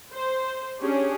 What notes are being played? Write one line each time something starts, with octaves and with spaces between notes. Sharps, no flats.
C5
C#4 D4 G4 G#4